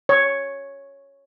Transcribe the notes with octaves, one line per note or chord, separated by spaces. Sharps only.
C#5